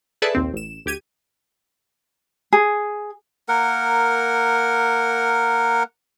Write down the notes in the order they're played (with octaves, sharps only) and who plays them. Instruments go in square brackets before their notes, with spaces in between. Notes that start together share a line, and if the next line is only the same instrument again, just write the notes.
[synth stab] G#4 A4 B4 D5 E5 A5
A#1 D#2 C4
A1 E7
D2 G4 G#6 D#7
[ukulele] G#4
[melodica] A#3 A#4 F#5